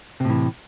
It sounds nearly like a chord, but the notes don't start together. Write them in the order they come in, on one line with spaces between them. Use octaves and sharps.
C3 A2 E3